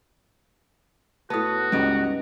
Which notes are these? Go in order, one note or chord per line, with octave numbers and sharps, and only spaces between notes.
A2 B3 F#4 A5 D#6
C#2 G2 C#4 D#4 D7